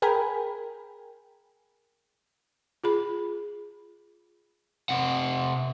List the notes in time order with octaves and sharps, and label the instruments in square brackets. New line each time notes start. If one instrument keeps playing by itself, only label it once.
[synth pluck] G#4 A#4 G5 G#5 B5
[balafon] F4 G#4 B5
[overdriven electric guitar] C3 F#5